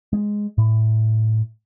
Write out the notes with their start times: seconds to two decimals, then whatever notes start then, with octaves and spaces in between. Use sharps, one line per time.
0.13 G#3
0.58 A2